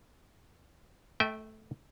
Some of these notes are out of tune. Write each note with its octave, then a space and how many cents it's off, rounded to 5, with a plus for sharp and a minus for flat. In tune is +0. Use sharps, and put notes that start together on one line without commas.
A3 -10 E5 -45 G5 +0